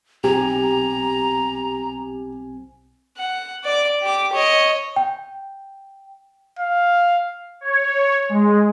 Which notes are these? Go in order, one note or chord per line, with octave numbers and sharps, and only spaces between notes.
B1 C4 G4 G#5 A#5
F#5
D5 D6
G4 D6
C#5 D#5
G5
F5
C#5
G#3